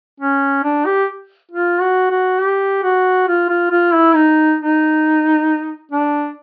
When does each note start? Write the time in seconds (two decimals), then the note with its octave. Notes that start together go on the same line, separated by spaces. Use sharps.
0.20 C#4
0.64 D4
0.86 G4
1.51 F4
1.81 F#4
2.11 F#4
2.40 G4
2.83 F#4
3.28 F4
3.49 F4
3.71 F4
3.94 E4
4.15 D#4
4.60 D#4
5.92 D4